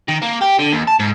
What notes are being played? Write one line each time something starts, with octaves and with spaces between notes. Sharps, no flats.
D#3
A#3
G4
D3
D#2
A5
G#2